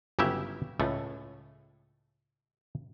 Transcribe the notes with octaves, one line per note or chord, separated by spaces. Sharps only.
G1 C#3 F#3 E4 G4 E5
C#2 A2 A3